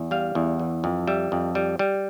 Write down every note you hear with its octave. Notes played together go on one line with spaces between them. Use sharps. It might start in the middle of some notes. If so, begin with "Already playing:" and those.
Already playing: E2
G3 F5
E2
E3
F2
G3 E5
F2
G3
G3